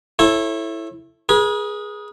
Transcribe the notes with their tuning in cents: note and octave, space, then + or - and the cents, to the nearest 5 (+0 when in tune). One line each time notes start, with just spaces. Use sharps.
E4 +5 A4 +0 C#5 -30
G#4 +0 B4 -45